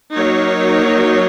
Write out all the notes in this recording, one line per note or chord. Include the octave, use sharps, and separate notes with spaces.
F#3 A#3 D#4 A#4 C#5